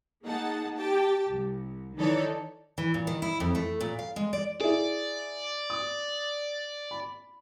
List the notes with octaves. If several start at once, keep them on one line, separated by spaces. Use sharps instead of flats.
A#3 D#4 G#4 F#5 A5
G4 G5 A5
C2
D#3 E3 D#4 A4 C#5 D5
E3
A#2
D#3
E4
F2
A3
A#2
F5
G#3
D5
E4 G#4 D5
D#6
B5